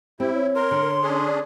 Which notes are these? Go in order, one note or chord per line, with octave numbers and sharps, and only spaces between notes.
C4 E4 G4
C#5
A#4 C6
D3
C#4 D4 G#4
D5